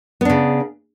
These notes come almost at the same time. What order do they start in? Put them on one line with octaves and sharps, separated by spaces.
B3 D4 C#3